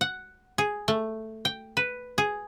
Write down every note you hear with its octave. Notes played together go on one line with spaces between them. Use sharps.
F#5
G#4
A3
G5
B4
G#4